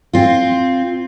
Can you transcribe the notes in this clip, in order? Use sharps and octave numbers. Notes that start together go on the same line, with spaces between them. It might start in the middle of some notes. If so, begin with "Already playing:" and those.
C4 F4